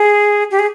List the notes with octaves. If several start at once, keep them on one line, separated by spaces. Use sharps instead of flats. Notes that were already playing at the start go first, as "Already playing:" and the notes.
Already playing: G#4
G4
G#4